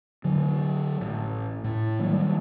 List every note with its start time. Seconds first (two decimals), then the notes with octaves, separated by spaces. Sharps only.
0.24 D3 F#3
1.01 A1
1.64 A2
1.99 D#3 F#3 G3 A#3